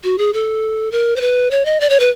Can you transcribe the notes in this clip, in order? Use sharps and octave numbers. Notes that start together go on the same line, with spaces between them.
F#4
G#4
A4
A#4
C5
B4
C#5
D#5
D5
C#5
B4